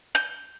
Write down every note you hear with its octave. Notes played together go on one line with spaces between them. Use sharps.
G6